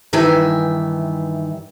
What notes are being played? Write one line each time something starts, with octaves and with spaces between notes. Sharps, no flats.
G2 D#3 E3 E5 G#5